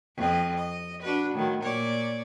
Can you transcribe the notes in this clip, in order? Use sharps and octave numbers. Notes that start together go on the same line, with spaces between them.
F2 C4 D#5
D#5
D4 F#4 B4
A2 D#3 F#3
A#2 C#5 D5